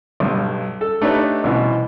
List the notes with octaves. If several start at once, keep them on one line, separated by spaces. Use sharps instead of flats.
B1 G2
A4
A3 D4 D#4 G4 B4 C#5
C2 B2 E3